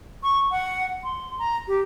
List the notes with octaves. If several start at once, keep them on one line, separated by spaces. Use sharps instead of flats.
C#6
F#5
C6
A#5
G4